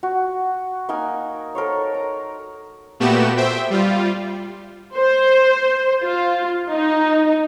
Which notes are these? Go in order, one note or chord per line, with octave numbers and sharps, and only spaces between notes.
F#4
A#3 D#4 A#4 G#5
A4 A#4 C5 C#5
A#5
A#2 A3 B3 F#4 G4 E7
C5 E5 G5
G3 F4
C5
F4
D#4